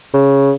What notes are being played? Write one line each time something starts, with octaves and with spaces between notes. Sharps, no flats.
C#3